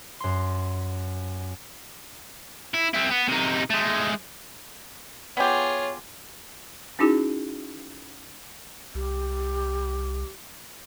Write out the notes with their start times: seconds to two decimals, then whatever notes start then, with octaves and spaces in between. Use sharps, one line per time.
0.20 F#2 C6
2.74 E4
2.94 C4 E4
3.10 B3
3.28 C3 D#4
3.70 G#3 A3
5.37 B3 F4 G4 G#4 C#5
6.99 C#4 D#4 E4 F#4 G#4
8.95 C2 G4